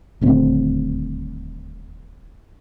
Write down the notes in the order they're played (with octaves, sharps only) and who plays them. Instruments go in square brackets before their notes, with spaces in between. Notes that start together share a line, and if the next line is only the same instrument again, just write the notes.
[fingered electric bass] D#1 D2 C4